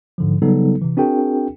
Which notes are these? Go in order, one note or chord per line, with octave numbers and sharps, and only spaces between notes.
G#2 D3 F3
C#3 F#3 G3 B3 D#4 A4
C3 E3
C4 D4 F#4 G#4 A#4 G5